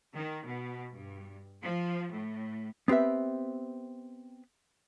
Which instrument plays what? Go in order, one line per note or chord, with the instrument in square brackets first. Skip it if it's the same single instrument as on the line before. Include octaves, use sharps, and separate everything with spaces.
[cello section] D#3
B2
G2
F3
A2
[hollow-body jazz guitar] B3 C4 G4 B4 E5